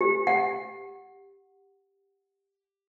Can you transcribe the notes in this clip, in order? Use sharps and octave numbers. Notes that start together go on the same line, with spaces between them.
G4
F#5